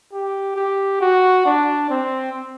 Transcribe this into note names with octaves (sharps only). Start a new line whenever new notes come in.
G4
G4
F#4
D4
C4